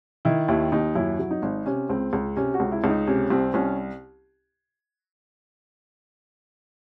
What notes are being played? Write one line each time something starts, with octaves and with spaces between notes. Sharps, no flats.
D#3 E4
D#2 E4
D#2 D#4
F#2 E4
F#3
D#4
G#1
C3 C#4
C#2 C4
C#2
C3 C#4
F#4
C#2
E4
C#2
D#4
C3 C#4
C2 C4
C2 C#4